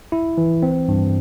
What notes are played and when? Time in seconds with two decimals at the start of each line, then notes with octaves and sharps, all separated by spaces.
0.12 E4
0.38 E3
0.63 C4
0.88 G2